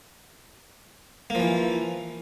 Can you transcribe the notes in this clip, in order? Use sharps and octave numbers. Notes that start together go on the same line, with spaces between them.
E3 F3 A#3